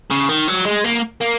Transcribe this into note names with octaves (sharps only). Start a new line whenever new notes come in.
C#3
D#3
F#3
G#3
A#3
A#3